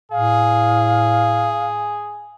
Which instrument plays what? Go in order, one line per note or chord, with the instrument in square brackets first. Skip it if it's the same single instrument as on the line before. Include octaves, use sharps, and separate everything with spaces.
[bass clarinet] A2 [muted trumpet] G#4 [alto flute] F5